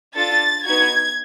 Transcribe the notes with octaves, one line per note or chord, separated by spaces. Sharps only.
D4 F4 A4 A6
B3 D#4 F#4 G#6